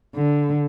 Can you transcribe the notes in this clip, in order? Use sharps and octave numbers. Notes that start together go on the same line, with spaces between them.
D3